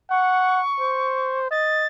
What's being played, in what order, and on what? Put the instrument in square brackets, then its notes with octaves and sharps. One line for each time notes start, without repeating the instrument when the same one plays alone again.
[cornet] F#5 [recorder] C#6
[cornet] C5
[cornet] D#5 [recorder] A6